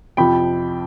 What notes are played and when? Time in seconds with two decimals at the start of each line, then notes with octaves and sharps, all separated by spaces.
0.17 F2 C3 F3 G5 B5